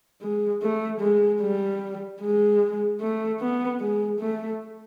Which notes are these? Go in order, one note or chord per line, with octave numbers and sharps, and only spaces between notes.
G#3
A3
G#3
G3
G#3
A3
B3
G#3
A3